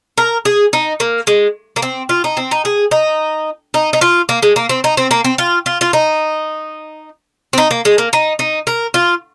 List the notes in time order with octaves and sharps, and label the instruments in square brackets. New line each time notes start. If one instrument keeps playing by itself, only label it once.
[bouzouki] A#4
G#4
D#4
A#3
G#3
A#3
C4
F4
D#4
C4
D#4
G#4
D#4
D#4
D#4
F4
A#3
G#3
A#3
C4
D#4
C4
A#3
C4
F4
F4
F4
D#4
C4
D#4
A#3
G#3
A#3
D#4
D#4
A#4
F4